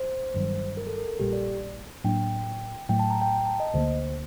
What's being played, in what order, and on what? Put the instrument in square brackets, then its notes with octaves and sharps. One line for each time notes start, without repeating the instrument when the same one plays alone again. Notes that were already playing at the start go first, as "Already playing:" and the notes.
Already playing: [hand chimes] C5
[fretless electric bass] G1 G2 D#3 F#3
[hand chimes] A#4
A4
A#4
A4
[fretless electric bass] A#1 A#2 G3 [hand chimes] G4
[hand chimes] D5
[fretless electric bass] A2 F#3 A#3 D4 [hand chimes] G5
[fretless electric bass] A2 F#3 A3 [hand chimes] G5
[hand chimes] A5
A#5
G5
A#5
A5
D#5
[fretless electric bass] D2 D3 F#3 A#3 [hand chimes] C5